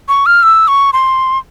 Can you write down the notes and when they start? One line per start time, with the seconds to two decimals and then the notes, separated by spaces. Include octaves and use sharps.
0.08 C#6
0.26 F6
0.43 E6
0.68 C#6
0.93 C6